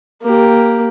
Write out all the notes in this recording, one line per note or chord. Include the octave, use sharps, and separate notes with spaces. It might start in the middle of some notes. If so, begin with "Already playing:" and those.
A#3 G4